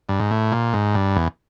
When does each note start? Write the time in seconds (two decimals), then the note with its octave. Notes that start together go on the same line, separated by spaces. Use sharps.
0.09 G2
0.20 G#2
0.31 A2
0.52 A#2
0.73 G#2
0.95 G2
1.16 E2